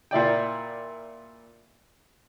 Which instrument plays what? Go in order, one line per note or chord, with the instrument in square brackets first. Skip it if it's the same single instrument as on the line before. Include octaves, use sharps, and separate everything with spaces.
[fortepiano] A#2 E4 D5 G5